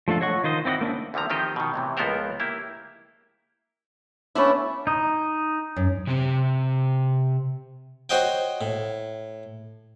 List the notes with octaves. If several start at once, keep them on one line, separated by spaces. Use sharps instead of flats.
F3 A3 D4 F4 A4
C#5 D#5 F#5 C#6
D#3 F4 C5 D#5
C4 E4 D5 D#5 F#5
A#3 C#4 D4 E5
D2 D3 D#3 F3 A#5
D#3 F3 C4 G4 D#5
B2 D#3
A2 C3 E3
C#2 F3 B3 A4 A#4 C5
A#3 E4 G4
A3 B3 C#4 D4 E4
D#4 D#6
F#2
C3 C4 G4
F#4 C5 C#5 D#5 F#5 G5
A2